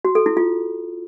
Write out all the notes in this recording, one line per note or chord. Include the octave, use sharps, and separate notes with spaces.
F#4
A4
E4
F4